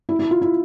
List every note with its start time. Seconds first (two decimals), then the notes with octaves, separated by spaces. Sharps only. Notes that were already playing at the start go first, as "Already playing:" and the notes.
0.09 E4
0.19 E4
0.31 F4
0.42 E4